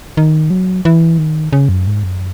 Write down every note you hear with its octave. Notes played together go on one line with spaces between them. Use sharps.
D#3
F#3
E3
D#3
C#3
F#2
G#2
F#2